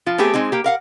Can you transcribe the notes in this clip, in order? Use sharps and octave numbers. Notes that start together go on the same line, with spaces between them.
F3 F4
A3 B3 C4 G4 G#4
G#3 C4 D#4 G#4
A#3 G4
A#4 F5 F#5